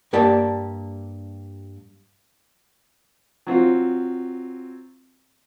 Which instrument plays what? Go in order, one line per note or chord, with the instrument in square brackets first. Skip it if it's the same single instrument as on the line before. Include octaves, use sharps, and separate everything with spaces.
[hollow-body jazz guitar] G2 A#3 G4 D5 A5
[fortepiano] F#3 C4 F4